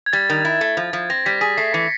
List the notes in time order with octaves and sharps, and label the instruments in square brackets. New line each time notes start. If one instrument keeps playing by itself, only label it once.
[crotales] G#6
[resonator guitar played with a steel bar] G3 [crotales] A6
[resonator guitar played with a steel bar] D#3
E4
A3
F3
F3
[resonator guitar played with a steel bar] C4 [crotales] A#6
[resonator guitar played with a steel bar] G3 [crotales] B6
[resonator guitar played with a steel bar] G#4 [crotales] B6
[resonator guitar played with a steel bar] A3 [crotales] C7
[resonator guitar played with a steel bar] E3 [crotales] C#7